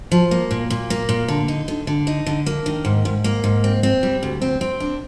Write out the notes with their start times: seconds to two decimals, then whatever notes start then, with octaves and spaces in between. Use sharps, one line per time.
0.12 F3
0.31 A#3
0.51 A#2
0.70 A#2
0.90 A#3
1.09 A#2
1.28 D3
1.48 D#4
1.68 D3
1.87 D3
2.07 D#4
2.26 D3
2.46 A#3
2.66 D#3
2.85 G#2
3.05 G#2
3.24 A#3
3.44 G#2
3.64 C4
3.83 C4
4.03 G3
4.23 D2
4.41 C4
4.61 C4
4.80 D4